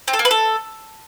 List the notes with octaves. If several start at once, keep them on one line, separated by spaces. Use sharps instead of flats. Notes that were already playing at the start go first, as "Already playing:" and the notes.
C4
A4
A#3
B4
A4